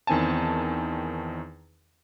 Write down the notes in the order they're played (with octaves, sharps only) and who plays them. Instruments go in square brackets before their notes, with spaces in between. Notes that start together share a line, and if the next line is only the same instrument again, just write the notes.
[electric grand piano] E2 D#3 C4 G#5 A5